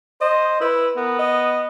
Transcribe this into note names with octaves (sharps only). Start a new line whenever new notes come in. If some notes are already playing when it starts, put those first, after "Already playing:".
C5 D#5
E4 B4
B3 A#4
D#5